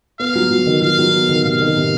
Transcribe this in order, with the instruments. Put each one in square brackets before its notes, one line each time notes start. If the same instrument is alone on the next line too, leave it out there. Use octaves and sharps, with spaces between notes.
[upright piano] B3 [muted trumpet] F5
[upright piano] F#3
F#3
D#3
[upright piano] F#3 [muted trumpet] F5
[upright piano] F#3
B3
D#3
[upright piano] C3 [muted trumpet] F5
[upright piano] D#3
C3